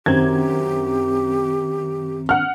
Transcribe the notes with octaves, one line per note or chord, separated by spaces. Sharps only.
F#2 D#3 C4 G4 G#6
F#5 F6